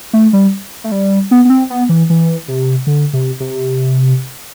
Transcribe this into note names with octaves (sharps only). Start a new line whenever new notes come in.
A3
G3
A3
G3
B3
B3
C4
B3
E3
E3
C3
D3
C3
C3